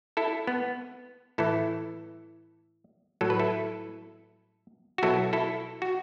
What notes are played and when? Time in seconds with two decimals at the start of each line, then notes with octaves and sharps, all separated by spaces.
0.17 E4 A4
0.47 B3
1.38 A2 E3 E4 A4
3.21 A2 F#3 A4
3.30 B4
3.39 E4 A4
4.98 F#4
5.03 B2 F#3 E4 A4
5.33 E4 A4
5.82 F#4